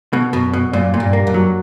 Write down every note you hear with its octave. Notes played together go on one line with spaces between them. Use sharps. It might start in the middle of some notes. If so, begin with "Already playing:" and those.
B2
F#2 B2
B2
F#2 A#2
A#2
G2
A#3
F#2
F#3